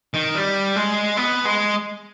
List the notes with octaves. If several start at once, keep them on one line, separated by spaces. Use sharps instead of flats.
D#3
G3
G#3
B3
G#3